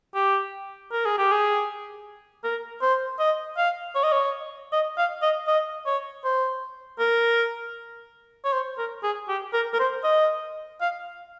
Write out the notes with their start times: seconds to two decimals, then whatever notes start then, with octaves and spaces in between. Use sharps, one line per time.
0.15 G4
0.92 A#4
1.05 G#4
1.18 G4
1.32 G#4
2.44 A#4
2.82 C5
3.19 D#5
3.57 F5
3.95 C#5
4.03 D#5
4.12 C#5
4.72 D#5
4.97 F5
5.22 D#5
5.47 D#5
5.86 C#5
6.24 C5
6.99 A#4
8.44 C#5
8.52 C5
8.78 A#4
9.03 G#4
9.29 G4
9.53 A#4
9.73 A#4
9.79 C5
10.04 D#5
10.81 F5